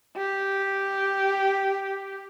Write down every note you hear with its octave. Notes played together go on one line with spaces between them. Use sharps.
G4